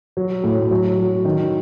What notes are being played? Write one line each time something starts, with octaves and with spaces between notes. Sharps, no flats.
F#3
A2
F#3
F#3
D#3